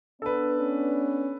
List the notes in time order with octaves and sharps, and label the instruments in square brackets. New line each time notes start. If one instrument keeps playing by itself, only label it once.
[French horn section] B3 D4 [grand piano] A4 B4
[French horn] C#4